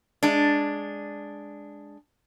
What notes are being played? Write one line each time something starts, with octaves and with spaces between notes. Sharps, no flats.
G#3 D4